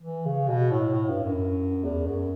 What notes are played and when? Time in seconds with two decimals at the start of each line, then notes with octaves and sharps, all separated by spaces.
0.03 E3
0.26 C#3
0.48 B2
0.71 A2
0.94 A2
1.09 G2
1.24 F#2
1.85 E2
2.07 F#2